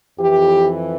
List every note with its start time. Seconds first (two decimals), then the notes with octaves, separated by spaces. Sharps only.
0.18 F2 E3 G4